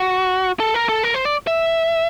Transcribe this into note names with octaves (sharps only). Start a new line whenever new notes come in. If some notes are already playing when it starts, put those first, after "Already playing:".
Already playing: F#4
A4
A#4
A4
A#4
C5
D5
E5